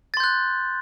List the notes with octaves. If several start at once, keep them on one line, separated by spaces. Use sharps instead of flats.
C6 F#6 G6 A6